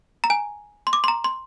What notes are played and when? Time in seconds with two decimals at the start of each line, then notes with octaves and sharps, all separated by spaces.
0.24 A#5
0.30 G#5
0.87 C6
0.93 D6
1.04 C6
1.08 A#5
1.24 C6